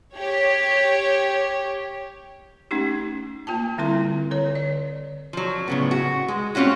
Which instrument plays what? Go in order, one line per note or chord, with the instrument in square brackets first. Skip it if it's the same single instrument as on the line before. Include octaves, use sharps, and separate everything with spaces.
[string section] G4 C#5
[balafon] A3 C#4 D#4 G4
A#3 F4 G5 A5
D3 G3 C4 E4 A4 C6
D3 A4 C#5
D5
[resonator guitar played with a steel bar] F3 F#3
A2 C#3 B3
F#4
G#3
A3 C4 C#4 F4 F#4